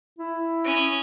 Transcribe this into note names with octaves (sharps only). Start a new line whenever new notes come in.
E4
C#4 D#6